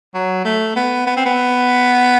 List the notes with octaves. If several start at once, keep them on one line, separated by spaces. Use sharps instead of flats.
F#3
A3
B3
B3
C4
B3